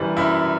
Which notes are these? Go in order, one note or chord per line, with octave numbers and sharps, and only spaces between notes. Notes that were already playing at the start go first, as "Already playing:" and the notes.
Already playing: F#2 E3 G3 D4
F#2 E4